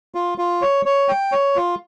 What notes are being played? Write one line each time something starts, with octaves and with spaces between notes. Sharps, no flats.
F4
F4
C#5
C#5
G5
C#5
F4